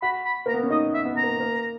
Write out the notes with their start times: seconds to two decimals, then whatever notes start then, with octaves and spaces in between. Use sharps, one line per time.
0.02 F#4 B5
0.25 B5
0.46 A#3 A#5
0.54 B3
0.63 C#4
0.70 D#4 D#5
0.94 E5
1.05 B3
1.17 A#5
1.23 A#3
1.40 A#3